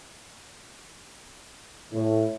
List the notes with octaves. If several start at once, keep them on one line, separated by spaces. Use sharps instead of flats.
A2